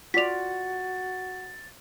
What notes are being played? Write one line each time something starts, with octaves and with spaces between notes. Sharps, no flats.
F4 F#4 D5 A6 B6 F7